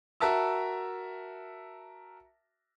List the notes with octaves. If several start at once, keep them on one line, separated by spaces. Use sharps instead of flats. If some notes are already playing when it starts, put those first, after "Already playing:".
F#4 A#4 E5 A5 E6